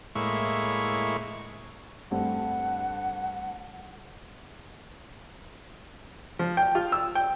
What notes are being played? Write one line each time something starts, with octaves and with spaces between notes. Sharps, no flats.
A2 G#3 A#3 E4 C#5 C#6
G2 A3 C4 F#5
F3
G5
F4
E6
G5